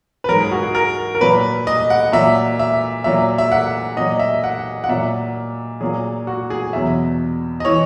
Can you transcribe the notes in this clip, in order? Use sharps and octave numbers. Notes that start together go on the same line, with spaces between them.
B4
G#2 F#3 A#4
G#4
F#4
G#4
A#4
A#4
A#2 F#3 B4
D#5
F#5
A#2 F#3 E5
E5
A#2 F#3 E5
E5
F#5
A#2 F#3 D#5
E5
F#5
F#5
A#2 F#3 E5
A#2 F#3 G#4
F#4
G#4
E2 B2 F#3 E5
D#5
E3 C#5